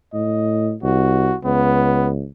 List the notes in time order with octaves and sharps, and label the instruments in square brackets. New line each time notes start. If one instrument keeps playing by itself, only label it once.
[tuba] A2 [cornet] D#5
[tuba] C2 [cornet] F#4
[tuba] C#2 [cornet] B3